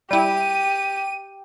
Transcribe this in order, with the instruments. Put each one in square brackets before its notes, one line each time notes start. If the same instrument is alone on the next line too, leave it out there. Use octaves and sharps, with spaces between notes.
[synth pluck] G3 E4 [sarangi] G4 [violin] D#7